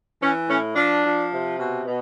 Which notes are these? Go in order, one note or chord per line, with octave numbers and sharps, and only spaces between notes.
E3 C#4
A2 C#4
F3 D4
F3
C3
B2
B2